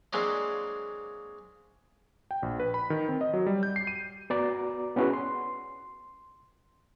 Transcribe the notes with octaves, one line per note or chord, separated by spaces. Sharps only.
F#3 G#3 A#3 C4 D4 E4
G5
A#1
B4
B5
D#3
C4
D#5
F#3
G3
G6
C7
D#7
B3 F#4 D5 A#5 D6
B3 C#4 E4 F#4 G#4 B4
C6